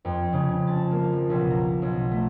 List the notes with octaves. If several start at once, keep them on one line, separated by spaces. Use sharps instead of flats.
F2
C#3
A5
A#3
F3
B1
A#5
B1
A3